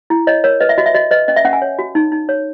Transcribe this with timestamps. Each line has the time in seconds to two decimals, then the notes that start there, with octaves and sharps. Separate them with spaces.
0.10 E4
0.27 C#5 D#5
0.44 A#4 C#5
0.60 B4 D#5
0.69 E5
0.78 F#4 D#5
0.86 E5
0.94 F#4 D#5
1.11 B4 D#5
1.28 C#4 D#5
1.36 E5
1.45 C#4 F#5
1.53 G#5
1.62 C#5
1.79 F#4
1.95 D#4
2.12 D#4
2.29 C#5